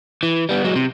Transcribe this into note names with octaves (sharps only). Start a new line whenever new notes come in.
E3
G3 B3
F#3 G#3
C3